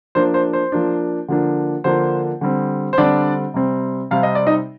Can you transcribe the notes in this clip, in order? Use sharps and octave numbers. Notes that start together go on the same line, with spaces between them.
F3 A#3 D4 C5
C5
C5
F3 A#3 D4
D3 F3 A#3 D4
D3 F3 A#3 D4 C5
D3 G3 C4
C5
D3 G3 C4 D4 D5
C3 G3 C4
C3 G3 C4 F5
D#5
D5
D#4 D#5